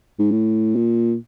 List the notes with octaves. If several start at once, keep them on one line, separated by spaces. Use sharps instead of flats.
G#2
A2
A#2